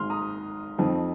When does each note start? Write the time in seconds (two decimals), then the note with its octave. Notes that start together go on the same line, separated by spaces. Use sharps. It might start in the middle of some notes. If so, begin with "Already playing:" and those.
Already playing: G#1 G#2 G#3 C6 F6
0.10 A#5 D#6
0.78 F2 F3 C4 D#4